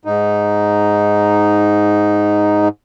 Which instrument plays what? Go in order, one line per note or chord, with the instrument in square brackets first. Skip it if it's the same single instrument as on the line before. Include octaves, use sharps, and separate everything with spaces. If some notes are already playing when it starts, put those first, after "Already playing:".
[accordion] G#2 D#4